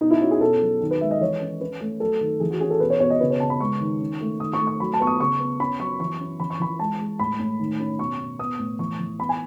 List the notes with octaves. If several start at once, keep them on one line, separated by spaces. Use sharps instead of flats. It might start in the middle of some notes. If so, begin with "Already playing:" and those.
B2 D#4
E4
C#4 F#4
G#4
B2 A4
F#3
D#3
B4
G#3 E5
D#5
E3 C#5
C#4
C#4 B4
A3
F#3 A4
D#3
E3 G#4
F#4
C#4 G#4
A4
B2 B4
C#5
B2 C#5
D#5
C#3 B4
C#5
C#3 A5
B5
G#3 C#6
D#3
C#4
A3
D#3 D#6
C#6
A3
C#6
F#3 B5
A5
B3 C#6
D#6
C#3 C#6
B3
C#4 B5
F#3 C#6
E3 C#6
C#4
E3 B5
C#6
E3 B5
G#3 A5
G#3
A2 B5
A2
D#3
C#4
B2 C#6
B2
B3 D#6
A2
E3 C#6
E3
B3 B5
G#5